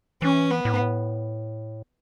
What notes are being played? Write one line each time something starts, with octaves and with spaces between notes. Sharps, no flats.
E3 C#4
B3
A2
G#2
A2